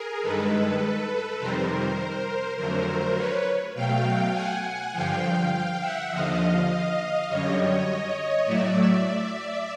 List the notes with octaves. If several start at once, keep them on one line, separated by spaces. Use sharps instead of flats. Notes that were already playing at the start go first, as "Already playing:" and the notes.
Already playing: G#4 A#4
G2 D#3 G#3 A4 B4
F2 C3 D#3 G3 A#4 C5
F2 D3 F#3 A3 A#4 C5
B4 C#5
B2 F#3 A3 F5 G5
F#5 G#5
F#5 G#5
G2 D3 F3 F5 G5
F5 G5
E5 F#5
D#2 D3 F3 D#5 F5
D#5 F5
F#2 D3 G3 C#5 D#5
C#5 D#5
A2 F#3 A3 D5 E5